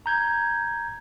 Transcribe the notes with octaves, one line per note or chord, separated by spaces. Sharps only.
A#5 G6 G#6